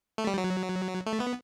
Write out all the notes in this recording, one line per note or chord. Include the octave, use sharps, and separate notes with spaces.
A3
G3
F#3
A3
B3